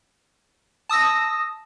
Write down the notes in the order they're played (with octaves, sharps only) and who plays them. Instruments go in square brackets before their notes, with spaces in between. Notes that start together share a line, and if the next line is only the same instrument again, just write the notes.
[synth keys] A5 D#6 E6 A#6